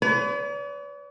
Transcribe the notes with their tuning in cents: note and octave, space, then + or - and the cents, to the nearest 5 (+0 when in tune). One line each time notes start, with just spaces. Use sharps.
B4 +30 D5 -45